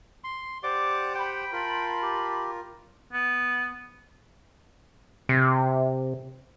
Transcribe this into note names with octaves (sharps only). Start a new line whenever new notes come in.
C6
G4 C5 D5 F#5 D6
G5 B5
F4 A#4 A5 B5 C6
G4
B3
C3